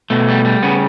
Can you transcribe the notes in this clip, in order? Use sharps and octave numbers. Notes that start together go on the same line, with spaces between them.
B2 A3
G3
G3
C#3 B3